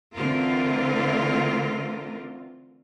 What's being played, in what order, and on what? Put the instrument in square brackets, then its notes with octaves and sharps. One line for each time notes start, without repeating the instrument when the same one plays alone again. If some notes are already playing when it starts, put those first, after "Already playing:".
[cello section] D3 E3 A3 C4 F4 A#4